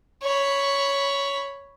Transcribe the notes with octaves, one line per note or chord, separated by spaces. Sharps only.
C#5 B5